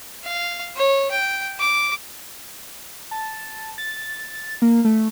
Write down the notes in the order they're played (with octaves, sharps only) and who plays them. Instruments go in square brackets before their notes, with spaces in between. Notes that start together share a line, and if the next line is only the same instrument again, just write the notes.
[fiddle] F5
C#5
G5
D6
[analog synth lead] A5
A6
A#3
A3